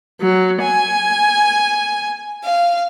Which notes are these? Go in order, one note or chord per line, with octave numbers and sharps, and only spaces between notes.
F#3
G#5
F5